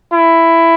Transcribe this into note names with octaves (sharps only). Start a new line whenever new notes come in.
E4